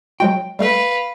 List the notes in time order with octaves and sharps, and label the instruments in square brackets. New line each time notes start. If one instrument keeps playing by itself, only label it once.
[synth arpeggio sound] F#3 G#3 F#4 [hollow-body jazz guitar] G5
[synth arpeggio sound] G3 A3 A4 [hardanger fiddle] B4 F5